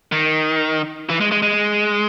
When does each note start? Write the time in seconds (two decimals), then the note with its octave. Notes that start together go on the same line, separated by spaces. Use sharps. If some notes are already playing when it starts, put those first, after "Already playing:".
0.12 D#3
1.09 E3
1.21 G#3
1.32 G#3
1.43 G#3